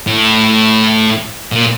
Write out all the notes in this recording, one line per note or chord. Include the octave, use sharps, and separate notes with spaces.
A2
A#2